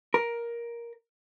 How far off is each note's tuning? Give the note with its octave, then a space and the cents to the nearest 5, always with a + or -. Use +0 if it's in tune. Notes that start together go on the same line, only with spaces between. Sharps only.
A#4 +10